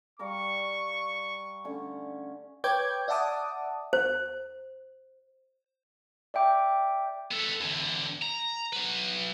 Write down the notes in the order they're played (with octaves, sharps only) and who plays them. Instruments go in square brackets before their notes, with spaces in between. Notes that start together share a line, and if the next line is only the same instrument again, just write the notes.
[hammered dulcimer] G3 F5 A#5 [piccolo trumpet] C#6
[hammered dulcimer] D3 A3 C#4
[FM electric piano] B4 C#5 G5 D6 G6 G#6
D5 E5 F#5 A5 D6 D#6
[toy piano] C5
[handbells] D5 E5 G5 D6
[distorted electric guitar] B3 A4
E2 D3
A#5
F#3 B4